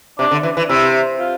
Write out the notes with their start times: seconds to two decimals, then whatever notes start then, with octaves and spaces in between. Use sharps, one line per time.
0.19 C3 D4
0.31 D3
0.43 E3
0.57 E3
0.69 C3 E4
1.19 F4